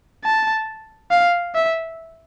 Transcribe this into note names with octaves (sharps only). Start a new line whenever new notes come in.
A5
F5
E5